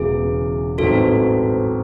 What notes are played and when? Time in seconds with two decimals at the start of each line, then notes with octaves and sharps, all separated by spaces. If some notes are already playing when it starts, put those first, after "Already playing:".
Already playing: E1 E2 C#3 F#3 G#4
0.78 A1 G#2 F#3 C4 F#4 A4